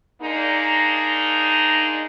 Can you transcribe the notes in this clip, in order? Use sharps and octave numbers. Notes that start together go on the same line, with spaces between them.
G#3 A#3 D4 D#4